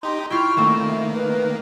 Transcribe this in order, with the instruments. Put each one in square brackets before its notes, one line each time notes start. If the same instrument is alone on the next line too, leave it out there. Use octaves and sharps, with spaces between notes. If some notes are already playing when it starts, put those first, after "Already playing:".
[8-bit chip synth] D#4 G4 [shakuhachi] C6
[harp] E4 F4 [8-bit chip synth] G5 F6 [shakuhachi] C#6
[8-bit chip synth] D#3 A#3 [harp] A3 C4 E7
[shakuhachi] E5
B4